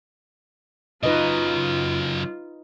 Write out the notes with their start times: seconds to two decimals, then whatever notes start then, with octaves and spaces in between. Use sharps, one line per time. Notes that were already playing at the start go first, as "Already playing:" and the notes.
1.03 C#3 F#3 D#4 F4 B4 D#5